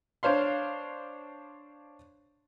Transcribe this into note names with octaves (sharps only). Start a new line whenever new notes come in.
D4 C5 C#5 F5 C6